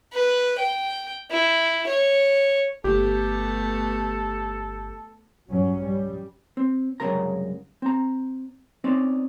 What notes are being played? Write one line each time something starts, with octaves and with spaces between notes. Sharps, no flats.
B4
G5
E4
C#5
G1 A3 B3 G4 A4
G2 F#3 C#4
G3
C4
C2 F#2 C#3 G#3 A#4 A#5
C4 A#5
C4 C#4 D#4 D5